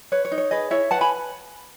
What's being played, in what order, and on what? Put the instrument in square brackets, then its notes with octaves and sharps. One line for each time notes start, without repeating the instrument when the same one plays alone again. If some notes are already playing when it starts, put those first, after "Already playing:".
[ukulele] B4 C#5
C#5
D#4
C#5
G#4 B4 D#5
E4 C#5 E5
B4 F#5 A5
G#5 B5